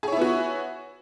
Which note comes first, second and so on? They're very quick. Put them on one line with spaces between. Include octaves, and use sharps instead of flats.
G#4 C#5 E4 B3 F#4